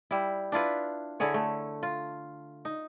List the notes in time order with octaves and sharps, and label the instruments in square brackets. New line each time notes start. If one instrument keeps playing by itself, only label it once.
[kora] G3 E4
D4 E4 F4 B4
D3 E4 G#4 C#5
A3
F4
D#4